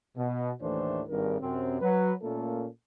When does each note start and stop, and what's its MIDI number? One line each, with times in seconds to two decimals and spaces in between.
0.17 0.51 47
0.62 1.02 39
0.62 1.02 45
0.62 1.02 52
0.62 1.02 57
0.62 1.02 62
0.62 1.02 72
1.08 1.40 32
1.08 1.40 43
1.08 1.40 70
1.40 1.81 42
1.40 1.81 48
1.40 1.81 60
1.81 2.13 54
1.81 2.13 71
2.22 2.66 46
2.22 2.66 57
2.22 2.66 58
2.22 2.66 61
2.22 2.66 65
2.22 2.66 69